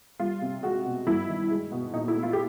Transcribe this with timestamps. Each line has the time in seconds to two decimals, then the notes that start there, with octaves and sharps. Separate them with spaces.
0.20 G3 F4
0.42 C3
0.63 G#3 F#4
0.85 B2
1.07 G2 E4
1.28 D#3
1.50 G#3
1.72 B2
1.94 A#2 D#4
2.08 E4
2.16 A3
2.23 F4
2.33 G4